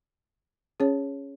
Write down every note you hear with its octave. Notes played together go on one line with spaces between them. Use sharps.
C#4 G#4 C#5